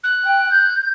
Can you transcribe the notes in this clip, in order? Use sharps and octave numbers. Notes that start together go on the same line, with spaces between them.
F#6
G5
G6